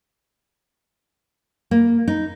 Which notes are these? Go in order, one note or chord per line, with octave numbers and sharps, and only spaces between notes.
A#3
D#4